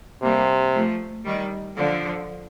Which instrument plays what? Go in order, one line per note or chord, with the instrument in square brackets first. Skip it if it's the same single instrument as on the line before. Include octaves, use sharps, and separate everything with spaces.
[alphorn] C3 [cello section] G3 A#3
[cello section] F3 A3
D#3 G3
D3 F3